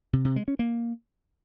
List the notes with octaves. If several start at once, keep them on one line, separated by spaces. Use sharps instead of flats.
C3
C3
G#3
C#4
A#3